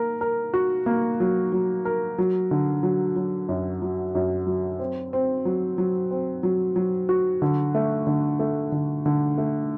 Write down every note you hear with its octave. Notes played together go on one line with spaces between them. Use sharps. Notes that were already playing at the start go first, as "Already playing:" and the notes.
Already playing: A#3 A#4
A#4
F#4
A#3
F#3
F#3
A#4
F#3
D3
F#3
F#3
F#2
F#3
F#2
F#3
C4
C4
F#3
F#3
C4
F#3
F#3
F#4
D3
A3
D3
A3
D3
D3
A3